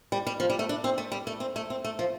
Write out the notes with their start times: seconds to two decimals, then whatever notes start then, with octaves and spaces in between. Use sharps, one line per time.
0.12 G3
0.27 G3
0.40 F3
0.50 G3
0.59 A3
0.69 D4
0.84 C4
0.98 A3
1.12 G3
1.27 A3
1.40 C4
1.56 A3
1.70 C4
1.84 A3
1.99 F3